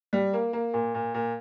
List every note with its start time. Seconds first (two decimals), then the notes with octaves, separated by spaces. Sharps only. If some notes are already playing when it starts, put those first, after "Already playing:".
0.13 G3
0.33 A#3
0.53 A#3
0.74 A#2
0.94 A#2
1.14 A#2